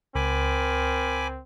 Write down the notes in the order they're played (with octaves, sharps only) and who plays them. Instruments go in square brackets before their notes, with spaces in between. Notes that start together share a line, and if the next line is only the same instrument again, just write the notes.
[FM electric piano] C#2 [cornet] C4 [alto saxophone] A#4 [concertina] G#5 B5 D6